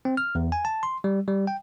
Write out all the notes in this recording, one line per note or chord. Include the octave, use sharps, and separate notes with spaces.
C4
F6
E2
G#5
A5
C6
G3
G3
G5